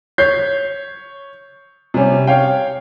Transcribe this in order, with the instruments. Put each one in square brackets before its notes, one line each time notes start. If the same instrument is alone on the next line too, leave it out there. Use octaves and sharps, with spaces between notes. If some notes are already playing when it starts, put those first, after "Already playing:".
[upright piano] C#5 G6 C7
C3 G3 C#4
C#5 F5 G5